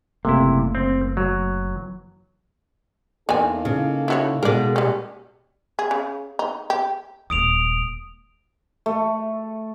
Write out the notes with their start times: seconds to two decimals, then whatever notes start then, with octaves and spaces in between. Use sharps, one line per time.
0.25 F#1 C3 A3 A#3 E4
0.75 C4
1.17 F#3
3.29 E2 D3 A#3 D#4 A4 G#5
3.65 C#3
4.08 E4 F#4 C#5
4.43 B2 G#3 A#4 D5
4.76 G3 C#4
5.79 G#4
5.91 C#3
6.39 D#4
6.70 G4
7.30 D#1 G#3 D#6 D7 F7
8.86 A3